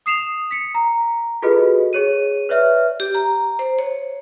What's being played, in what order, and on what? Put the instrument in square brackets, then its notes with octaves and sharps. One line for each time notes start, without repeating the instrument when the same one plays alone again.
[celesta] D#6 C7 E7 F7
B6 C#7
A#5
F4 F#4 G#4 A4 B4 D#5
G#4 C#5 D#7
B4 C#5 D5 E5 F6
[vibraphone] G4
A#5
C5
C#5